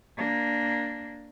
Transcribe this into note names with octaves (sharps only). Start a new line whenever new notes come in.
A#3 D4